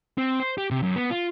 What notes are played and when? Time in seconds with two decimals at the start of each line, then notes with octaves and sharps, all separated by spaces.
0.18 C4
0.40 C5
0.58 G4
0.71 C3
0.83 F#2
0.96 B3
1.11 F4